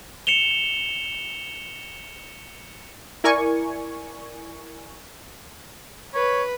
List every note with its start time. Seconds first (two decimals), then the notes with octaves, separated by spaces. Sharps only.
0.27 C#7 E7 F7 G7
3.24 E4 A#4 D5 G#5 C#6
6.14 B4 C#5